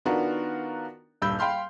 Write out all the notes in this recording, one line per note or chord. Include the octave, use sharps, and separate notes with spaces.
D#3 B3 D4 F4 F#4 A#4
D#1 G2 B5 E6 G6
F5 G5 B5 C6 F6